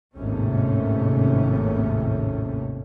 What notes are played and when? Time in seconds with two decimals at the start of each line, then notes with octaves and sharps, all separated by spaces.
0.16 G#1 D#2 A2 C3 A3 C#4